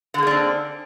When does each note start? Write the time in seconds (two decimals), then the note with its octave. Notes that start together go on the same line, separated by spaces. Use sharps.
0.14 D3
0.18 G#4
0.23 A#3
0.27 D4
0.31 C4